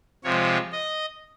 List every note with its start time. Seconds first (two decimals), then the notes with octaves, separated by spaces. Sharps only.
0.24 C3 F3 G#3 C#5
0.73 D#5